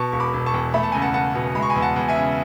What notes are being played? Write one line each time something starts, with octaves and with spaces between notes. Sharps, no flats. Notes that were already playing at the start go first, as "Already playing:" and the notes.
Already playing: B2 A5 C#6
E1 C#6
B5 D6
E1
A5 C#6
E2
A3 B5
A5
C#2 G#5
F#5 A5
C#2 F#5 A5
B2
G#3 B5
C#6
G#5 B5
E2
F#5 A5
E2
E5 G#5
C#3